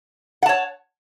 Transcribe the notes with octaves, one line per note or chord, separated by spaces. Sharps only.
C#5 F#5 A5